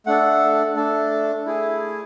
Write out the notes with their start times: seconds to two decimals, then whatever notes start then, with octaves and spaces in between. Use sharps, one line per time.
0.06 A3 D4 A4 F#5
0.75 A3 D4 A4
1.46 A3 E4 G#4